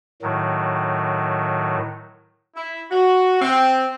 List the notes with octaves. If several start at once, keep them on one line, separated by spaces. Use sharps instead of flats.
A2 D#3 F#3
E4
F#4
C4